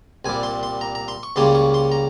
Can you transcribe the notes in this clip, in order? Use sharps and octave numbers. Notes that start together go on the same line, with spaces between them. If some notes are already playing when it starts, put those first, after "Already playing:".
C2 A#2 G3 G#5
C6
C6
A#5
A#5
C6
C#6
C#2 C#3 G3 A#3 C#4 C6
C#6
C6
A#5